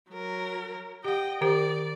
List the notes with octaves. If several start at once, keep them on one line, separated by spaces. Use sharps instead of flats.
F#3 A#4
G4 D#5 F#5 G5
D#3 G4 C5 D5